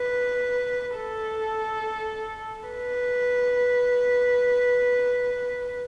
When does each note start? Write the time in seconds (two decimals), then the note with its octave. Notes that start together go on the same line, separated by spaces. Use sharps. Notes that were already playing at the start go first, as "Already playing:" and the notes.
Already playing: B4
0.96 A4
2.68 B4